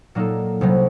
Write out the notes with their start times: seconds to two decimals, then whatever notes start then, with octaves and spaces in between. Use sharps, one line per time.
0.15 A#2 F#3 A#3 D#4 A4
0.61 C2 C3 F#3